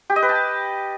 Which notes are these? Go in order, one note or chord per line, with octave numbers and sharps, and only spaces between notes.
G4
D#5
B4
A5